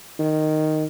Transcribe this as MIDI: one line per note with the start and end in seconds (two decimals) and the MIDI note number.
0.19 0.85 51